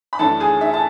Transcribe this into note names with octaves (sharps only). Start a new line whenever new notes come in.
B5
F#2 E3 A3 D4 A4 A5
G#4 G#5
E4 E5
A5